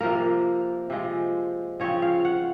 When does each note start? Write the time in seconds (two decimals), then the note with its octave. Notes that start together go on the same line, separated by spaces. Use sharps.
0.01 C3 F3 A#3 A#4
0.90 C3 F3 G#3
1.80 C#3 F3 C4 C#5
2.02 F5
2.25 F#5